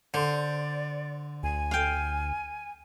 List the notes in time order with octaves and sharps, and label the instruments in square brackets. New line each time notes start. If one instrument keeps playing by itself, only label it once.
[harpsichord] D3 [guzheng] C5 [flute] D5
[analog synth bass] D2 [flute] G#5
[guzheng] F5 G5